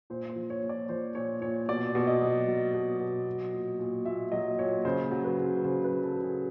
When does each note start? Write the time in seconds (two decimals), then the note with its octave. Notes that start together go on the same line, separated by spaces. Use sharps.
0.10 A#2 C5
0.30 C5
0.36 F3
0.50 C#5
0.63 A#2
0.69 D5
0.89 F3 C5
1.15 A#2 C#5
1.41 A#2 C#5
1.69 B2 D5
1.95 B2
2.07 D#5
2.21 F#3
2.48 F#3
2.74 B2
3.00 B2
3.26 F#3
3.53 A#2
3.79 A#2
4.05 A#2 E5
4.32 F#3 D#5
4.59 A#2 C#5
4.85 C#3 C5
5.11 F#3
5.24 B4
5.38 C#3
5.64 C#3 C5
5.84 B4
5.90 F#3
6.04 A4
6.17 C#3
6.23 G#4